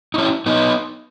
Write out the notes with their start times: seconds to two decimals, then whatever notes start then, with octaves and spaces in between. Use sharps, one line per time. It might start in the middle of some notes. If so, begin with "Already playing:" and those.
0.14 D#4
0.18 C#4 E4
0.46 B3 D#4